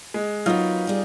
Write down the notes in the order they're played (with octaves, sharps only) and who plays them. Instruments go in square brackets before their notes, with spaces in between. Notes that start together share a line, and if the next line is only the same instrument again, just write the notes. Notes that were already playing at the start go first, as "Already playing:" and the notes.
[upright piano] G#3
[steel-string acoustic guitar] F#3 A#3 B3 [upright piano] D#4 F4
[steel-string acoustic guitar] G3 G#4